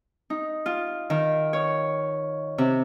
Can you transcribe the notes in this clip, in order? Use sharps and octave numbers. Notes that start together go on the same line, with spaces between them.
D#4
F4
D#3
C#5
C3